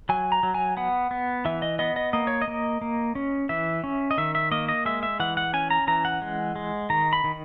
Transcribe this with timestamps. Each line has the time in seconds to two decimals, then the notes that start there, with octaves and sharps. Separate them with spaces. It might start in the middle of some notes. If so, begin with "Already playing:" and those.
0.09 F#3 G#5
0.32 A#5
0.43 F#3
0.54 G#5
0.77 B3 F#5
1.11 B3
1.45 E3 E5
1.62 D#5
1.79 B3 D#5
1.96 D#5
2.13 A#3 D#5
2.27 C#5
2.41 D#5
2.48 A#3
2.81 A#3
3.15 C#4
3.49 E3 E5
3.84 C#4
4.11 D#5
4.18 D#3 E5
4.35 E5
4.51 A#3 D#5
4.69 D#5
4.85 G#3 E5
5.03 E5
5.20 E3 F#5
5.37 F#5
5.53 C#4 G#5
5.70 A#5
5.87 E3 A#5
6.05 F#5
6.22 G#3
6.56 G#3
6.90 D#3 A#5
7.13 B5
7.24 D#3